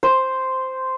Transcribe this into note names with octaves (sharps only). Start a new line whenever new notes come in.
C5